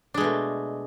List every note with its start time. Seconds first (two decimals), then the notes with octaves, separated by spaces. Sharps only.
0.14 D4
0.17 G#3
0.21 B2
0.24 A3